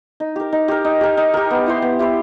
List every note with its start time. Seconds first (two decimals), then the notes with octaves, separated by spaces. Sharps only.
0.20 D#4
0.36 G4 A#4
0.52 D#4
0.68 G4 A#4
0.85 D#4
1.01 G4 A#4
1.17 D#4
1.34 G4 A#4
1.51 B3
1.66 E4 G4 C5
1.82 B3
1.99 E4 G4 C5